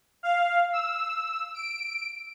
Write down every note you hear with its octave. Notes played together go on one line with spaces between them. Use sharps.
F5
E6
D7